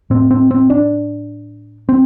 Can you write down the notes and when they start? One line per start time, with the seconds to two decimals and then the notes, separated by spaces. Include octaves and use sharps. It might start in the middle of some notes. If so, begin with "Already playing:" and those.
0.10 A2 C4
0.31 C4
0.51 C4
0.70 D4
1.89 C4